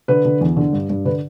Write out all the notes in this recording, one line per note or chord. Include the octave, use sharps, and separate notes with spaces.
D3 B4
D3
E2
D3
G2
G2
D3 B4